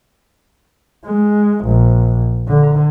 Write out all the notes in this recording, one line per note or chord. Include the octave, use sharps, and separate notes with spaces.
G#3
A#1
D3